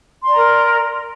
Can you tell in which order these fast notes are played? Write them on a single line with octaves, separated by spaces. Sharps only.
C6 D5 A#5 A#4